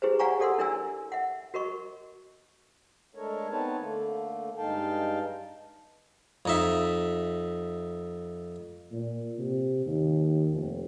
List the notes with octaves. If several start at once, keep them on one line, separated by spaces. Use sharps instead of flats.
E4 G4 G#4 B4 C5
D5 F5 F#5 G#5 A#5 C#6
G4 A4 D5 F#5 C6 E6
D4 E4 A#4 D5 G#5 E6
E5 F#5
F#4 A#4 D#5 C#6
G#3 A3 D4 A4 A#4 C#5
B3 C4 D#4 B4 C#5 A5
D3 A3 A#3
G2 G#3 D#4 F5 G5 A5
F2 D#4 E5
A#2
C3
D#2
F1